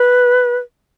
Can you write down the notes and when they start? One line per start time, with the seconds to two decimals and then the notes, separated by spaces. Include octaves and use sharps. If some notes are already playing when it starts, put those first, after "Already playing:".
Already playing: B4